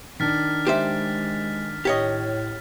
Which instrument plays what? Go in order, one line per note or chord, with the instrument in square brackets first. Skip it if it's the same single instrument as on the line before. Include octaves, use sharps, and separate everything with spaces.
[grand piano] D#3 D4 [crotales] F6 A6 B6
[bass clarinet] G#3 [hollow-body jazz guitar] G4 C5 E5
[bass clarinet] A2 [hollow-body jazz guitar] G4 C#5 D#5